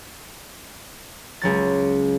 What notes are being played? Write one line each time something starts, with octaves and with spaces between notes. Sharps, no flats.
C#2 F#3 A6